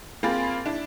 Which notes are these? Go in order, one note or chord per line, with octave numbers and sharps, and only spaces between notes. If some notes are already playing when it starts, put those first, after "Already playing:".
A#3 C4 F4 G#4 B5 A6
D4 E4